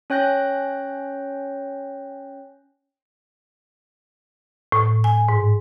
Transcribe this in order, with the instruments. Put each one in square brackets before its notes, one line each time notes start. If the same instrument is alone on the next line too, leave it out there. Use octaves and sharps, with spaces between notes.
[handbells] C#4 C#5 G5 F#6 G6 A#6
[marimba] A2
G#5
G#2